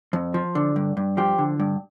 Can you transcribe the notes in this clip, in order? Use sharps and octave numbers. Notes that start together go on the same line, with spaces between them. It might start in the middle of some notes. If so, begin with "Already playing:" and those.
F2
F3
D3
G2
G2
F3 G4
D3
G2